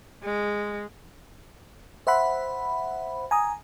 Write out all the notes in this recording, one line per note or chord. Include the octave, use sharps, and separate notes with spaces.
G#3
C5 E5 F#5 B5
G#5 A#5 D#6